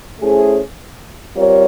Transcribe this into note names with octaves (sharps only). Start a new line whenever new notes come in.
A3 C#4 E4 G#4 C5
G3 C4 F4 A#4 C#5